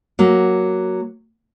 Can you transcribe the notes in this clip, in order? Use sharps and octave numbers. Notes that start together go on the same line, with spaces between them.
F#3 A#3